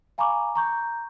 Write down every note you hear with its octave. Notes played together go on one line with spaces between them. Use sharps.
F5 G#5 A#5 B5 C#6 D6
A#5 C#6 G6